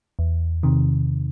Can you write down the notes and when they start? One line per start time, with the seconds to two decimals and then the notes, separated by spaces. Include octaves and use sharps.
0.19 E2
0.63 C3 D#3